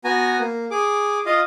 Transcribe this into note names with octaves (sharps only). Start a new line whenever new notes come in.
B3 F#4 G#5 A#5
A#3
G#4 D6
F4 D#5 F5